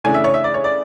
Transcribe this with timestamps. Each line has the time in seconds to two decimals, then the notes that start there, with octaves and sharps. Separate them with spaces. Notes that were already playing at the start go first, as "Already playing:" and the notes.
0.04 C#3 E3 A3 D4 G#5
0.14 E5
0.24 C#5
0.34 E5
0.44 D5
0.54 C#5
0.64 D5